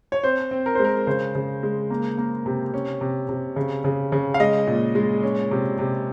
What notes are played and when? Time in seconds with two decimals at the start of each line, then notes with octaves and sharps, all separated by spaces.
0.12 C#5
0.24 C4 C5
0.51 C4
0.66 A#4
0.75 G#3 C5
0.85 A#4
1.07 C#3 C5
1.35 C#3
1.63 G#3
1.90 A#3
2.18 A#3
2.46 C3
2.74 C#4
3.01 C3
3.29 C3
3.56 C#3
3.84 C#3
4.12 C#3
4.34 F5
4.40 G#3 D#5
4.67 A#2
4.95 G#3
5.23 C#4
5.51 C3
5.79 C3